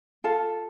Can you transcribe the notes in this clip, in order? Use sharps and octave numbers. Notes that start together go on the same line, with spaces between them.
F4 A4 F5 A5